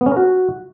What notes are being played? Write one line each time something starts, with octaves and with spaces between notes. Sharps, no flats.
B3
C#4
A#4
F#4